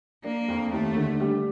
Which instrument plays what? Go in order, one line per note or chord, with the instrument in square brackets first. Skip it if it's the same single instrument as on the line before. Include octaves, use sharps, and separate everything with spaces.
[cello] A#3 [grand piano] D4
[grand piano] F2
[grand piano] D#2 [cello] A3
[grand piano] D3
G3